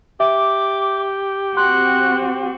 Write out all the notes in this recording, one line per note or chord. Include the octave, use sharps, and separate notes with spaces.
G4 E5 D6
C4 F#4 C6 F#6